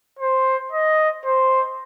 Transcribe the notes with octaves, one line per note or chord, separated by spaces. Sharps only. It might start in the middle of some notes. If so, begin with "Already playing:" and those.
C5
D#5
C5